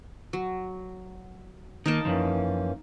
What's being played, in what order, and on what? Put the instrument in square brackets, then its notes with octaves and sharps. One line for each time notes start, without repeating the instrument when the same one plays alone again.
[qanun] F#3
[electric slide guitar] D#3 A#3 [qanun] D#4 A5
[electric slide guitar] F#2 A#2 F3 [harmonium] E3 A#3 C#4